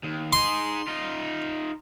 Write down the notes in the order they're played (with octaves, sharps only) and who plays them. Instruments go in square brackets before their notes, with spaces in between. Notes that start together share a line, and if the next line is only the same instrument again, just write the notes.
[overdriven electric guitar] D#2
[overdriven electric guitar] D#4 G#4 [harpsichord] C6
[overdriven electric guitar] D#4 F4